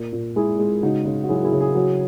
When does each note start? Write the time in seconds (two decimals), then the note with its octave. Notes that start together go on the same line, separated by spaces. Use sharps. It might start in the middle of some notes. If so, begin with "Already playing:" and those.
Already playing: A#2 A#4
0.13 A#2
0.36 G#3 E4 G#4
0.59 G#3
0.83 C#3 D#4 F#4
1.05 C#3
1.24 F#4
1.29 F#3 E4 G#4
1.36 F#4
1.44 E4 G#4
1.52 C#3
1.60 E4 G#4
1.75 F#3